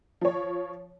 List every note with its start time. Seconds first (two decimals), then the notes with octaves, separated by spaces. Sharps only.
0.21 F3 C#5